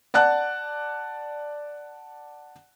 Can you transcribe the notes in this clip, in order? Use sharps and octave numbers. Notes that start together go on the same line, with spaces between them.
D5 F#5 A5 F#6